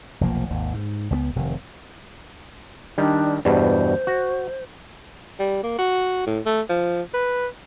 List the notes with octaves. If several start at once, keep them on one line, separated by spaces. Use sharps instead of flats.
F1 B1 F3 A#3
G#1 D#2
G#2
C#2 G#3 B3
F1 C3 D#3
D#3 G3 D4
E2 G2 B2 C5
F#4
G3
A#3
F#4
A2
A3
F3
B4